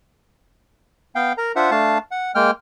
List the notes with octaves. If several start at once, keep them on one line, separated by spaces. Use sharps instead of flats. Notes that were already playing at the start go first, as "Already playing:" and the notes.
B3 F5 G5
A#4 A#5
D4 F4 C5 E5 F#5
A3 D4 F5 A5
F#5
G#3 A#3 G5 F6